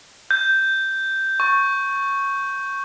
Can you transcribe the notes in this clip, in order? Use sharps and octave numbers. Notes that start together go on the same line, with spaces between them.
G6
C#6